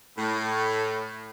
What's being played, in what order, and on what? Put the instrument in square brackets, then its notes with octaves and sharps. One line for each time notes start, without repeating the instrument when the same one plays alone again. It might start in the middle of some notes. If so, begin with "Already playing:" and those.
[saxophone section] A2